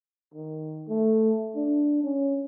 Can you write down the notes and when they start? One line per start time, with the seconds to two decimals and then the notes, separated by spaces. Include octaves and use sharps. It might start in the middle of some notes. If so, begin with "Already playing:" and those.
0.34 D#3
0.88 A3
1.55 D4
2.03 C#4